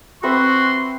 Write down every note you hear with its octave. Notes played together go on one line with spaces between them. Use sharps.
C4 F#4 B4 E5 C6